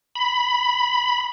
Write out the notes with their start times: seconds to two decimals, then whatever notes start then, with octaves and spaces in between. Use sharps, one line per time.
0.16 B5